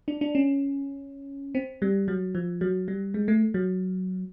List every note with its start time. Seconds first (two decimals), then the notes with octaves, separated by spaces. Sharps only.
0.08 D4
0.21 D4
0.35 C#4
1.55 C4
1.82 G3
2.08 F#3
2.35 F3
2.61 F#3
2.88 G3
3.14 G#3
3.28 A3
3.54 F#3